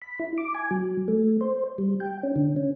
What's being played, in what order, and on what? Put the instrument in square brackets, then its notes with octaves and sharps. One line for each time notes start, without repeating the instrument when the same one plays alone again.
[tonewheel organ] B5
E4
D6
G#5
F#3
A3
C5
G3
G5
C#4
D3
C#4